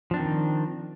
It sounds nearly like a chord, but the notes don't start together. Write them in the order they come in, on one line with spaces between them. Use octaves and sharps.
F3 D4 C4 D#3